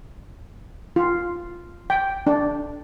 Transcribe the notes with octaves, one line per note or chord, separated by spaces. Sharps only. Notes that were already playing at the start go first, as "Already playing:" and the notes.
F4
G5
D4